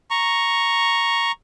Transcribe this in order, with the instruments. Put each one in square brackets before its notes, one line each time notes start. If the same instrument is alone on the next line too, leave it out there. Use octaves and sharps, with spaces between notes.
[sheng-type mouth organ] A#5 C#6